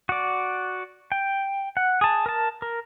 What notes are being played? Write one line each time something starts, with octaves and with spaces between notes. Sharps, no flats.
F#4 D5
G5
F#5
G#4 A5
A#4 A5
A#4